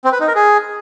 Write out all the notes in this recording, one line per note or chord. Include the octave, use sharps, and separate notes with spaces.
C4
B4
D#4
A#4
G#4